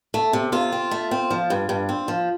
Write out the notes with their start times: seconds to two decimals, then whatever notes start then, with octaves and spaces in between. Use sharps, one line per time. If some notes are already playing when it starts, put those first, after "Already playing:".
0.14 A3
0.33 C3
0.52 C3 F4
0.72 C4
0.91 A3
1.11 C4
1.31 F3
1.50 G2
1.69 G2
1.89 C4
2.08 F3